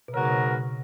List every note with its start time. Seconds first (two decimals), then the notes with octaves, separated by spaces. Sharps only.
0.08 B2
0.14 G#2 C#3 F#3 B3 F#4 A#4
0.25 B2